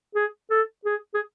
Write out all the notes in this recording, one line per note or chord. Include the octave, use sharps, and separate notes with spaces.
G#4
A4
G#4
G#4